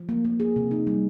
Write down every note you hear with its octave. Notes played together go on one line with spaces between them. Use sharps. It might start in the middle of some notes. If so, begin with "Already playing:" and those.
Already playing: F3
A#3
A#3
G#4
C3
D#4
G3